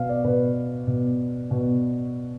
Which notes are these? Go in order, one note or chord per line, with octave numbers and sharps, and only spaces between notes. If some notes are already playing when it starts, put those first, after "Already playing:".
Already playing: B2 F5
D5
B2 B4
B2
B2